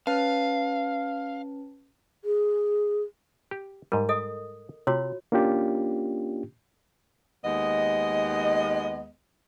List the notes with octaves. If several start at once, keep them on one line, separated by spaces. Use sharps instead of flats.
C#4 B4 F5 A5
G#4
G4
G#2 G3 A#4
A4 D#5 D#6
C3 F4 F#4 C#5
A#3 C#4 D4 F4 G4
D#2 G#3 B3 D#5